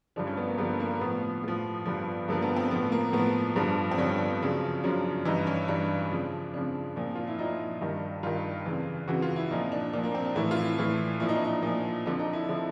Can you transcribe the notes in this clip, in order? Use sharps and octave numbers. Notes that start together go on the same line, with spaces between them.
G2 D3 F3 D4
C#4
B3
A#3
G2 D3 F3 B3
A#3
A2 F3 B3
A2 F3
G2 D3 F3
G2 D3 F3 A#3
B3
C4
A2 F3 B3
A#3
A2 F3 B3
G2 D3 F3
C4
G2 D3 F3 C#4
F#2 C#3 F3
F#2 C#3 F3 D4
G2 E3 D#4
C#4
G2 E3 D4
F2 C#3 F3
F2 C#3 F3 D4
A#2 F3
F4
E4
A#2 F3 D#4
G2 D#3
G2 D#3 F4
F2 C#3 E3
F2 C#3 E3 F#4
F4
E4
A#2 F3 D#4
D4
A#2 F3 D4
A#3
C4
D4
A2 E3 E4
F4
E4
A2 E3
A#2 F3 E4
D#4
D4
D#4
A#2 F3
F2 D3 F3 D4
D#4
E4
D3 F3